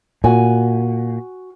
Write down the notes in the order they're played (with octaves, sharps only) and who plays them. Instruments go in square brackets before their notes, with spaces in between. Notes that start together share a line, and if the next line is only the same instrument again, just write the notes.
[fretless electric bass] A#2 [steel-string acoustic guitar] F#4 G#5